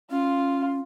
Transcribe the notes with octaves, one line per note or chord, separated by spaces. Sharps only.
C#4 F4